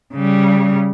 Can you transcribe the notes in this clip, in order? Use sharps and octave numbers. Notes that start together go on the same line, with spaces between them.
C#3 G3